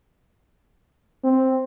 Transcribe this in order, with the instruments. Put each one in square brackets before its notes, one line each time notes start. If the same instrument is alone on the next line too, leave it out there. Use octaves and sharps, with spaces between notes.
[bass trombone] C4